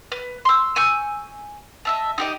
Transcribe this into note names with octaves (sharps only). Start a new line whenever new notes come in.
B4
C6 E6
G#5 C#6 E6 G6
D#5 E5 A5
D#4 G4 D#5